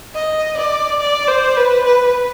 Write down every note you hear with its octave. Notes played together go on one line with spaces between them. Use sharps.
D#5
D5
D5
C5
B4
B4